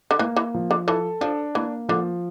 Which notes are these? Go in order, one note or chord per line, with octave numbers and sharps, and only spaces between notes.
D3
E3 A#3
E3
F3
D3
E3 A4
F3 D4
E3 A#3
D3 F3